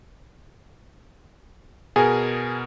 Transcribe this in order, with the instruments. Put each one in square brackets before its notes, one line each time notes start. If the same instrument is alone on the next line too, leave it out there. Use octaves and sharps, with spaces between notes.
[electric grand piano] B2 A#4 [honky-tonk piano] G#4